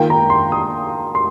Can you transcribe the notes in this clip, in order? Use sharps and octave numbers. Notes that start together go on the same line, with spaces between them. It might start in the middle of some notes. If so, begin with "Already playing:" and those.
Already playing: D#3 A#3 F4 G5
A#5
C6
D#6
C6